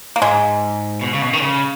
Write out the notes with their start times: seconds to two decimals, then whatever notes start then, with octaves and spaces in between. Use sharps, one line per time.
0.16 A#3
0.22 G#2 G#3
1.01 B2
1.14 C#3
1.22 B2
1.33 D#3
1.42 C#3